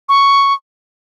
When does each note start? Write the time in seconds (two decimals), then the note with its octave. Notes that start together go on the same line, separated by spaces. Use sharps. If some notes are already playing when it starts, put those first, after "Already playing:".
0.09 C#6